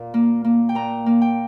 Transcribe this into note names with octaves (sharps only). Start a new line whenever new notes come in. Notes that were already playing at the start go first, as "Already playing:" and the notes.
Already playing: A#2
A#3
A#3
G5
A#2 A#5
A#3
G5